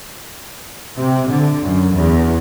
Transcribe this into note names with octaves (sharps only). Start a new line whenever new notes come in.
C3
D3
F#2
E2